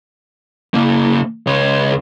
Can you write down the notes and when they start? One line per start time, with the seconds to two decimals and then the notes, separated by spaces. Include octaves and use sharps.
0.74 C#3 A#3
1.47 C#2 C#5